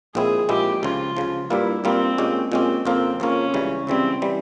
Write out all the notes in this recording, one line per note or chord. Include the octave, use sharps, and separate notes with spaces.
A#1 A#2 G#3 C4 E4 G#4
A#1 A#2 G#3 C4 E4 G4
C#2 C#3 F3 F4
C#2 C#3 F3
G2 G3 A#3 E4 F4
G2 G3 A#3 C4 F4
A#2 G#3 C#4 G4
A#2 G#3 C4 C#4 G4
F2 C#3 F3 A#3 C4 F4
F2 C#3 F3 A#3 C#4 F4
C#2 C#3 E3 G3
C#2 C#3 E3 G3 C4
E3 G3